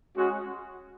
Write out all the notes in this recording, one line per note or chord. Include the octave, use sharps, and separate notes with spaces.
G#3 C#4 F#4